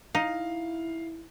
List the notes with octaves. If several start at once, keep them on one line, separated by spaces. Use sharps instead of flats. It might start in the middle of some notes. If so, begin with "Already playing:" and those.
D#4 E4 F5